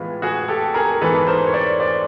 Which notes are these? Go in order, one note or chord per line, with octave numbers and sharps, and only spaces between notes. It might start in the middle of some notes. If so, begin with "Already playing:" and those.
Already playing: A2 E3 G#3 B3 F4
F#4 G#4
G4 A4
G#4 A#4
G#2 E3 G#3 B3 A4 B4
A#4 C5
C#5
C5 D5
C5 D5